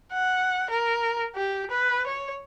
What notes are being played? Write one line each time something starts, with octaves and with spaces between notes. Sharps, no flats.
F#5
A#4
G4
B4
C#5